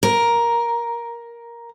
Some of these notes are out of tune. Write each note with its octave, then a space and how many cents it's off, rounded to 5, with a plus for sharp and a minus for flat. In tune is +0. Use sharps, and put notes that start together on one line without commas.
A#4 +10